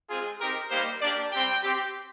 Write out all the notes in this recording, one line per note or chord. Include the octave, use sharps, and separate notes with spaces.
G#3 C4 F4 G#4
C4 D#4 G4 A#4
G3 A#3 D#4 G4 C5
A#3 D4 G4 D5
G3 C4 G4 G5
C4 G4